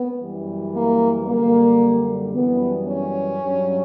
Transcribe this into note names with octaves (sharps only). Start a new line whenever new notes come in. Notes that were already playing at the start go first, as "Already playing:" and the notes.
Already playing: B3
F#2 E3 G3
A#3
F#2 D3 G3 A#3
F#2 E3 G3 B3
C#4
G2 F#3